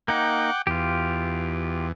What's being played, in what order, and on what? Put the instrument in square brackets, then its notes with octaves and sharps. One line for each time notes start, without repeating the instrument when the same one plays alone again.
[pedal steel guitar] A#3 D#4 [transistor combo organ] F#5 G5 D6
[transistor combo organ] E2 [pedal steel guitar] F4 G4